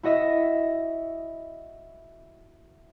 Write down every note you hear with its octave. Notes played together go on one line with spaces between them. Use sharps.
E4 F#4 D#5 E5